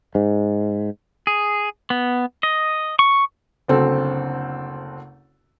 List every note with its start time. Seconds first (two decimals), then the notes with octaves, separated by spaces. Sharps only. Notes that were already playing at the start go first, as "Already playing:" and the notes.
0.15 G#2
1.27 G#4
1.90 B3
2.43 D#5
2.99 C#6
3.68 F#1 D2 C4 A4